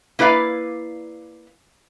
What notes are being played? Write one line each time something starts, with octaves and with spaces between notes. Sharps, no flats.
A#3 E4 B4 D5 F5